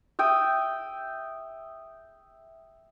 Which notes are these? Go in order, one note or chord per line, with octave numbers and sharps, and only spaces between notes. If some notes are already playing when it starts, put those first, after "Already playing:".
E5 G5 D#6